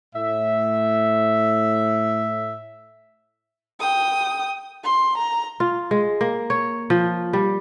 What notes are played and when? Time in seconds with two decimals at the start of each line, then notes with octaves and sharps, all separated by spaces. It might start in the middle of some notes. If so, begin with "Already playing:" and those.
0.15 A2 E5
3.80 G5 D#6
4.84 C6
5.18 A#5
5.60 F4
5.91 G#3
6.21 A#3
6.50 C#5
6.90 F3
7.33 G3